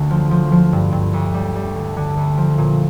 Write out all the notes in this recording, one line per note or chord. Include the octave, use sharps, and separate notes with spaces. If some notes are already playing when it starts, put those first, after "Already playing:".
Already playing: D2 D3 A#3
F3
F3
F3
G2
G2
D2
G3
G3
D3
D3
D2
F3
A#2